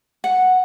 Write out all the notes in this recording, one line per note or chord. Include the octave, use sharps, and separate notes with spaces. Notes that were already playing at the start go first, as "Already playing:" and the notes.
F#5